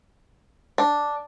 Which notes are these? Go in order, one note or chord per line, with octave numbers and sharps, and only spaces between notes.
D4